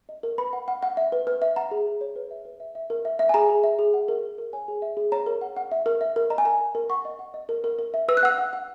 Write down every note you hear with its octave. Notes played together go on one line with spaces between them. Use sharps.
D#5
A#4
B4 B5
F#5
F#5
F#5
E5
B4
B4
E5
F#5 A#5
G#4
G#4
C#5
B4
E5
B4
E5
E5
A#4
E5
E5
G#5
G#4 A#5
G#4
E5
G#4
F#5
A#4
A#4
A#4
C#5 G#5
G#4
E5
G#4
C#5 A#5
A#4
F#5
F#5
E5
A#4
E5
A#4
D#5 A#5
G#5
A#4 A#5
A#4
A#4
F#5 C#6
D#5
F#5
D#5
A#4
A#4
A#4
E5
B4 E6
F#6
F#5 E6
F#5
F#5